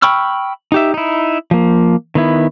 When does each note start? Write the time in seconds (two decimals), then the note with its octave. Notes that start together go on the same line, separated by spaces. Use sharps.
0.02 G5 B5 C#6 E6 F6
0.72 D#4 G4 E5
0.94 D#4 E4
1.51 F3 A#3
2.15 D#3 B3 E4